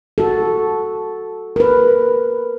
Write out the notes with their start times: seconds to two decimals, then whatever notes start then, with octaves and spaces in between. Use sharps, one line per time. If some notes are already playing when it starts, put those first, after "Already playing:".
0.18 F#4 A4
1.56 A#4 B4